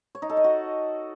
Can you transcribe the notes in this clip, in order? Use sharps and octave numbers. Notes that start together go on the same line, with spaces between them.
C#5
D#4
A4
D#5
F#4